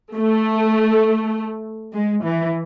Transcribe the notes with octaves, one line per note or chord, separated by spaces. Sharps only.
A3
G#3
E3